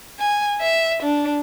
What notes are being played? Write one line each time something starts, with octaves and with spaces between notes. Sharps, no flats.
G#5
E5
D4